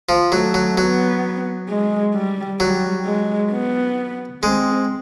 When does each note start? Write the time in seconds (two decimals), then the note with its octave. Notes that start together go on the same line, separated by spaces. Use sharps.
0.09 F3
0.32 F#3 A3
0.54 F#3
0.77 F#3 B3
1.69 G#3
2.14 G3
2.60 F#3 G3
3.05 G#3
3.51 B3
4.43 G#3 C4